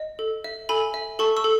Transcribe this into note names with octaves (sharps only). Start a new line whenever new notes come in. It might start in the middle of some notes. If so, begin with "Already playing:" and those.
Already playing: D#5
A4
E5
A4 G#5 B5
E5
A4 A5 C#6
C#6 E6
A4